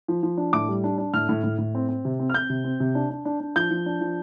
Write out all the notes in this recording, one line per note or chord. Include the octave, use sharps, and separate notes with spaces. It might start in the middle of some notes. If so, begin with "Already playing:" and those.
F3
F3
D4
A2 D6
G3
D4
D4
A2 F6
A2
A2
A2
C4
C4
C3
C4
F6
C4 G6
C3
C4
C3
D4
D4
D4
D4
F3 G6
F3
D4
F3